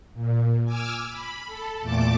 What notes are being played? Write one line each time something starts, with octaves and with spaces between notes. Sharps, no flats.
A#2
G#5 D6 E6 F6
B5
A4
E2 A#2 A3 A5 D6